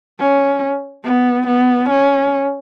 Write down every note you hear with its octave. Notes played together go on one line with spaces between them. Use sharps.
C#4
B3
B3
C#4